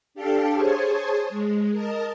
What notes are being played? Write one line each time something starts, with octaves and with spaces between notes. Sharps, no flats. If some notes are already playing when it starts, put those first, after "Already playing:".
D4 G4 A4 F5 G5 A5
G#4 C5 C#5 G#5 A5
G#3
A#4 D#5 A5